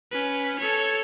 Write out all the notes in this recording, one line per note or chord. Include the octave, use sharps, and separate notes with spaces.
C#4 B4
A4 C#5